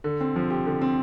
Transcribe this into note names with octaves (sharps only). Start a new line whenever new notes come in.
D3
C4
F3
G4
D3
C4